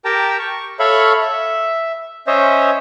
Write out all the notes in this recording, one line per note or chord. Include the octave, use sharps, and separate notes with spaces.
G4 A#4 G5 A5 A#5
C#6
A4 C#5 E5 F5 B5 C#6
E5
C#4 C5 C#5 D#5 E5